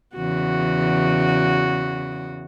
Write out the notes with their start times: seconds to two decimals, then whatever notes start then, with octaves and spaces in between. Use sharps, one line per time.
0.15 E2 C#3 F#4